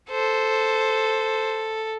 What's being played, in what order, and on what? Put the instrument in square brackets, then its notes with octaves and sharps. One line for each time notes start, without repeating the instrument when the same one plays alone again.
[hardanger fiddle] A4 [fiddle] C5